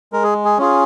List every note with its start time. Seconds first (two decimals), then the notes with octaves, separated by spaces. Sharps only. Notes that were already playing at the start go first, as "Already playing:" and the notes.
0.12 G#3 A#4
0.23 G#4
0.45 G#4
0.58 C#4 F4 G#4